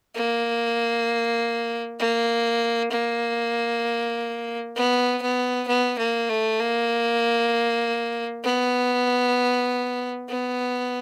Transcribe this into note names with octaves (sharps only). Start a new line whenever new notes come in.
A#3
A#3
A#3
B3
B3
B3
A#3
A3
A#3
B3
B3